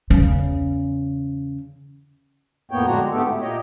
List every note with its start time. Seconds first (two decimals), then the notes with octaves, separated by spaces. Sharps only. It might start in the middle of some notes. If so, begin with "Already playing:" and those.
0.10 E2 C#3
2.71 F2 A2 A#3 B3 C#5 G5
2.86 F2 D3 G#3 D4 F#4 A#5
3.00 G#3
3.12 G#2 D3 A3 B3 G4 A4
3.28 E4
3.41 A#2 A#3 G4 C#5 D#5